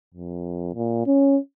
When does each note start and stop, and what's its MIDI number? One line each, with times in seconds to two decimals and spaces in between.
0.14 0.70 41
0.75 1.05 46
1.06 1.37 61